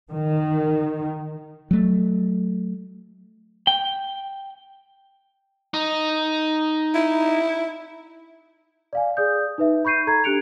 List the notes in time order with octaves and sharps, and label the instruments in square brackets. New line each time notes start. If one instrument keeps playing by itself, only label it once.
[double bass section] D#3
[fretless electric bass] F#3 A3
[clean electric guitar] G5
[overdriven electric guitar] D#4
[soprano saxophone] E4
[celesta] D5 F5 G#5
G#4 D5 D#6 G6
D#4 B4 E5
B5 C#6 G6 C7 D#7
A4 A#5 G#6
D4 G4 F#6 C#7 D7 F7